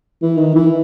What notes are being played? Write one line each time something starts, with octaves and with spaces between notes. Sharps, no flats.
E3
D#3
E3